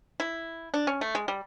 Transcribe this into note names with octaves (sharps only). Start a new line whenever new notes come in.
E4
D4
C#4
A3
G#3
G3